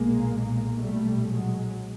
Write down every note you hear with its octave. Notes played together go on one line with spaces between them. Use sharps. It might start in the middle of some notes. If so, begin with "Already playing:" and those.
Already playing: B1 A#2 G#3 A#3
G#3 A#3
G3 A3
F#3 G#3